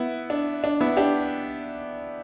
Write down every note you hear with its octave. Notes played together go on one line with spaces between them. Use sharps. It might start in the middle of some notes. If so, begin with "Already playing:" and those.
Already playing: B3 E4
D4
D4
B3 E4
D4 G4